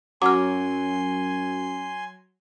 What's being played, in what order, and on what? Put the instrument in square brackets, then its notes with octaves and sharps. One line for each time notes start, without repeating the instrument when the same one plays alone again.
[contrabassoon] F#2 [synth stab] F#3 [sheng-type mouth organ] G#5 C6 [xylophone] D6 F6